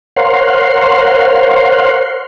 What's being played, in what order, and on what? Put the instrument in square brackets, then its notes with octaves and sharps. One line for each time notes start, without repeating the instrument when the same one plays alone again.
[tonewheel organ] A#4 C5 C#5 F5 F#5 C6